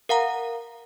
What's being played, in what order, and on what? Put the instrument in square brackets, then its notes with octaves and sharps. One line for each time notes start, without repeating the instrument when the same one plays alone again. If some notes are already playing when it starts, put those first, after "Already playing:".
[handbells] A#4 F5 F#5 A#5